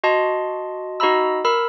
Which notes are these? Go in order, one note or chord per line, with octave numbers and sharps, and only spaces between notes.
F#4 D#5 A5 C6
D#4 F#4 D#5 A#5 B5 E6
A#4 B5 E6